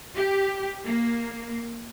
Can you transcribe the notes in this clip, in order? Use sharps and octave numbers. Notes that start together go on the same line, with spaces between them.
G4
A#3